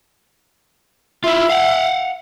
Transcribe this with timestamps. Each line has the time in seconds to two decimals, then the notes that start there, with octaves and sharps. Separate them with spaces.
1.24 E4 F4 E5
1.50 F5 F#5